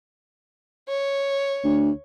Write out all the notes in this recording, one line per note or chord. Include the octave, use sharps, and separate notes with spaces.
C#5
D2